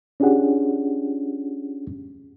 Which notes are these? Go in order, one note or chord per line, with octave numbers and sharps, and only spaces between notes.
C#4 D4 F4 G4 G#4 F#5